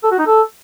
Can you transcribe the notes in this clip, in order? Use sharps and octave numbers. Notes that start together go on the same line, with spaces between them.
A4
F#4
D#4
A4